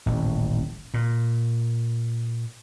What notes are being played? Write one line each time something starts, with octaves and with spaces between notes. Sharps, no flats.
D#1 A1
A#2